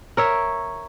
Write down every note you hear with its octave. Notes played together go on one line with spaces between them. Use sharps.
A#4 C#5 E5